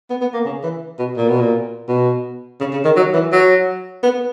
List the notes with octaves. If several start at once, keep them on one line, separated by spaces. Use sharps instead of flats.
B3
B3
A#3
C#3
E3
B2
A#2
B2
A#2
B2
C#3
C#3
D#3
F#3
E3
F#3
B3